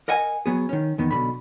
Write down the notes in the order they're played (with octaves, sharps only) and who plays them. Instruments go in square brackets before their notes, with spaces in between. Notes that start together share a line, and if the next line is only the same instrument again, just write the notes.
[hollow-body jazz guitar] A#4 D#5 F#5 G#5
F#3 B3 G#4
D#3 C#4
E2 D#3 B3
B1 F2 B2 D3 B5